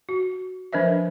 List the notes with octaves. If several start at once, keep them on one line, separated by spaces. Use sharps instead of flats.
F#4
F3 D4 A#4 C5 D#5 E5